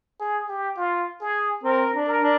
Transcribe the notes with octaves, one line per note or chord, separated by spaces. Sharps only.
G#4
G4
F4
G#4
C4 A#4
D4
A#4
D4